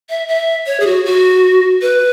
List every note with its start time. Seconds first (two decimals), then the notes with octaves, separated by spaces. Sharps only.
0.10 E5
0.28 E5
0.66 C#5
0.80 G#4
0.87 F#4
1.05 F#4
1.82 B4